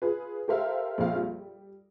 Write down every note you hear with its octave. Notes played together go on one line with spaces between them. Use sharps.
F4 G#4 B4
G4 A4 A#4 C5 E5 F5
A#1 F2 F5
G3